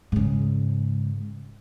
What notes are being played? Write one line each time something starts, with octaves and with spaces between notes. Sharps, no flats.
G#2 C#3